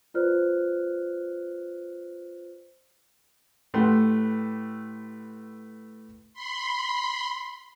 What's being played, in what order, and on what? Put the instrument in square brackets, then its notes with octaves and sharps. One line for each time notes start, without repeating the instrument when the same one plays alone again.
[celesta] F4 B4 C5 D5 F6 F#6
[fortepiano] A2 A3 G4 B4 F#5 C6
[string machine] B5 C6